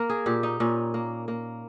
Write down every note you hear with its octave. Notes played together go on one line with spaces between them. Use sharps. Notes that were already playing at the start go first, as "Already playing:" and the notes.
Already playing: A#3 A#4
G#4
A#2 G4
D#4
A#2 C#4
A#3
A#3